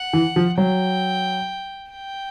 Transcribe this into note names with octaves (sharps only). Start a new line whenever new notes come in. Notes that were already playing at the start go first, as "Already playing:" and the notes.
Already playing: F#5
E3
F3
F#3 G5
G5